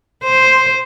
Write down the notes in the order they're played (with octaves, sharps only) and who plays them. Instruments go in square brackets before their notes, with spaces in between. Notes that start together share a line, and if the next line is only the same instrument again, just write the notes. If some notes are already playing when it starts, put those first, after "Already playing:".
[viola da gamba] C5